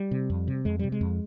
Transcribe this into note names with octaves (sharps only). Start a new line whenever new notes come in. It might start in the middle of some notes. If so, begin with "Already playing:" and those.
Already playing: G3
C3
F2
C3
F2 G#3
C3 G3
G#3
F2